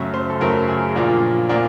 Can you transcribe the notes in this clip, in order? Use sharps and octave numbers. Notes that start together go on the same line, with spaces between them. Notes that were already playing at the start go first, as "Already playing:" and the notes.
Already playing: F#2 C#3 F#3 A3 E5
C5
A4
F#2 C#3 F#3 A3 A#4
G#4
A#2 F3 A#3 D4
A#2 F3 A#3 D4